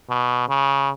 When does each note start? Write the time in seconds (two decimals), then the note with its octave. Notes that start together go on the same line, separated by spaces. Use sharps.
0.10 B2
0.49 C#3